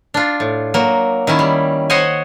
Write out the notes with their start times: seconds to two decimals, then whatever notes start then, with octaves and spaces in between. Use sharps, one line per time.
0.14 D4 F4
0.40 A2
0.74 F#3 A#3
1.27 D#3 C#4 E4
1.39 G3
1.90 C5 C#5 D#5 F#5 G#5